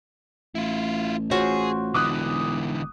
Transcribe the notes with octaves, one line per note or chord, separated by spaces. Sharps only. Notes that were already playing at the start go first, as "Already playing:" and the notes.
A1 E4 F4
F4 F#4 G#4 C5 C#5
E1 D3 E3 D6 D#6 F#6